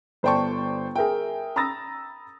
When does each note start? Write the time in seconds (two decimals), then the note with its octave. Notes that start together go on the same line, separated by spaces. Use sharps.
0.23 G1 C5 D5 G5 A5 C#6
0.95 G#4 A#4 E5 G5
1.56 A#5 B5 D#6 E6 A6 A#6